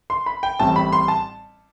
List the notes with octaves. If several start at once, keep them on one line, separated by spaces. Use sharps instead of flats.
C6
B5
G5
A1 A2 G3 C4 A5
B5
C6
A5